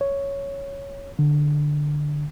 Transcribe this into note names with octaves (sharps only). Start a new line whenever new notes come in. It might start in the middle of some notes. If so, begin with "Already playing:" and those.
C#5
D3